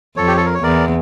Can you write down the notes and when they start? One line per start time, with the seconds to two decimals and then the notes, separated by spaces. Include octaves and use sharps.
0.17 F2 A4 C#5
0.28 G4
0.37 A4
0.46 A#4
0.54 C#5
0.63 E2 A#4 D5